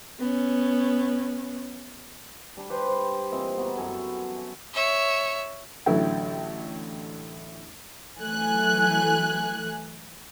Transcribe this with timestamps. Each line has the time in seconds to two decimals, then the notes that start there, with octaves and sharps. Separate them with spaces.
0.19 B3 C#4
2.57 G3 D4
2.70 G4 B4 C5 G5
2.88 C5
3.32 A#2 E3 C4 D#5
3.58 B3 F#4 A#5
3.77 F#2 E3 A4 G#5
4.74 C#5 E5
5.86 A1 D3 F#3 E4 A4 G5
8.18 E3 F#3 A3 G#5 F#6